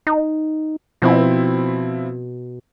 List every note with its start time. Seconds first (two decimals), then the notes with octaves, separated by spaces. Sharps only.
0.07 D#4
1.02 B2 F3 C4 E4